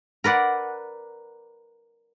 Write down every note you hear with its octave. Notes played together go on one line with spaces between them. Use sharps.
A#4 B4 D5 F#5